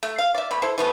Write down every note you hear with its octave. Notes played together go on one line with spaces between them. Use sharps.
A3
F5
D5 E5
B2 A3 B5
E4 A4 C5
E3 A3 B3